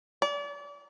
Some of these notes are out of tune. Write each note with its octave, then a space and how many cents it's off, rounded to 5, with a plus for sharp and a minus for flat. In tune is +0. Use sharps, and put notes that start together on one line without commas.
D5 -35